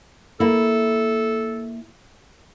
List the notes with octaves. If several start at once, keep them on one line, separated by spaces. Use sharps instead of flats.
A#3 E4 A4